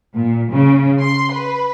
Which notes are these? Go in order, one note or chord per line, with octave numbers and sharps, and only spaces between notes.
A#2
C#3
C6
B4